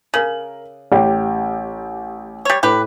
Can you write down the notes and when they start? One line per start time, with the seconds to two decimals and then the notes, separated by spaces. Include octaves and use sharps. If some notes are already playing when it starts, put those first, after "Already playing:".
0.14 C#3 A#4 F#7
0.92 A1 G4
2.45 G3 C#5
2.63 A2 G4 B4